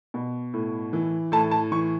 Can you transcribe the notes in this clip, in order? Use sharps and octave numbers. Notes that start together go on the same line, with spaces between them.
B2
A2
E3
A2 A5
A5
E3 C#6